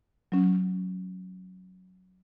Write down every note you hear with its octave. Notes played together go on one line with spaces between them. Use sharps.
F#3 C#4